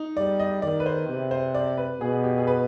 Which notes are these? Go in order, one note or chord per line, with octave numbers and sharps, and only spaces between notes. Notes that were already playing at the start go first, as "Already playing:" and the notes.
Already playing: D#4
G3 D5
D#5
D#3 D5
B4
C5
C3
C5
D5
B4
B2 G#4
G4
G#4
B4